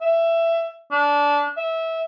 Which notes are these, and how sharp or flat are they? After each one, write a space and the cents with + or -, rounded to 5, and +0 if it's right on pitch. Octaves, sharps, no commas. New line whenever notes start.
E5 +15
D4 -20
E5 -20